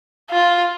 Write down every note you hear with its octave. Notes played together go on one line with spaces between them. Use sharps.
F4